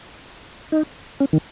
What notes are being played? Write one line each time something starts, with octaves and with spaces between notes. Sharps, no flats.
D#4
C#4
D#3